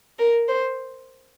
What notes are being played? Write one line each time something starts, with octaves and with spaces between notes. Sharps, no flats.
A#4
C5